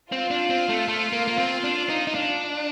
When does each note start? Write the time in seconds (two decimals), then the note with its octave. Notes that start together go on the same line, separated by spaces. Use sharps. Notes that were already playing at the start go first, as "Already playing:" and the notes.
0.12 C4 F4
0.31 D4
0.50 C4
0.69 A3
0.88 A3
1.13 A#3
1.28 A#3
1.38 C4
1.64 D4
1.89 D#4
2.07 D#4
2.15 D4